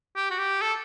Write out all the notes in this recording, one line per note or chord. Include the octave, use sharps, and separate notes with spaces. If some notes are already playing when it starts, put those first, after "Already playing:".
G4
F#4
G4
A4